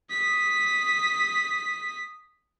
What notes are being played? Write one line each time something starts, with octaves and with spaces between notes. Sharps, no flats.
D#6 B6